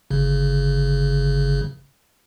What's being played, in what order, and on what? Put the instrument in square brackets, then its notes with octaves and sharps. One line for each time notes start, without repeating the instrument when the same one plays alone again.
[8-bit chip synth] G1 C#3